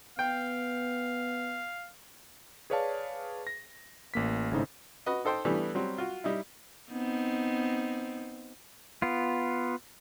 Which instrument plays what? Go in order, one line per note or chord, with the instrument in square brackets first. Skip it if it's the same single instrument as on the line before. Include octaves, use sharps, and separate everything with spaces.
[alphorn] B3 [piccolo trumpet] F5 [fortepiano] G5
[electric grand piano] G#4 B4 C#5 D5 F5 A5
A#6
A1 A#3 B6
G#1 A2 C#3 D#4 C5
[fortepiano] F#4 B4 D#5
D#4 A4 C5 G5
E3 G3 A3 B3 D4
F#3 G3 C4
F4 F#4
G3 D#4 E4
[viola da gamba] B3 C4 D#4
[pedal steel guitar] B3 F4